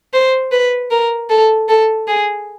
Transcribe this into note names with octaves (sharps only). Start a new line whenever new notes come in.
C5
B4
A#4
A4
A4
G#4